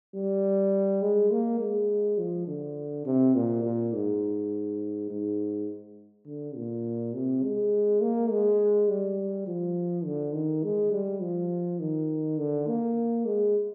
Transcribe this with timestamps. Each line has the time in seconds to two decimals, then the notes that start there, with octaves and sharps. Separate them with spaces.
0.15 G3
1.02 G#3
1.31 A#3
1.60 G#3
2.18 F3
2.47 D3
3.06 C3
3.35 A#2
3.64 A#2
3.93 G#2
5.10 G#2
6.26 D3
6.56 A#2
7.13 C3
7.43 G#3
8.01 A#3
8.31 G#3
8.88 G3
9.47 F3
10.05 D3
10.34 D#3
10.63 G#3
10.92 G3
11.21 F3
11.80 D#3
12.38 D3
12.67 A#3
13.25 G#3